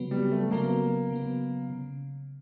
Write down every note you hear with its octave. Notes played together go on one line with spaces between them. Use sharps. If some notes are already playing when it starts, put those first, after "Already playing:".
Already playing: C#3 F#3 B3
G3
A3
C#3 F#3 A#3 B3
C#3 F#3 B3
C#3